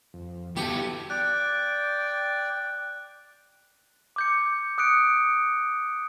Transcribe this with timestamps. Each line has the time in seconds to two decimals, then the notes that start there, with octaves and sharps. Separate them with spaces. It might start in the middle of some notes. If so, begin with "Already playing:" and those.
0.14 F2
0.57 B3 E4 F#4 G4 A4
1.10 D5 G5 F#6
4.16 D6 G6 C#7
4.78 D#6 F#6 C#7 D7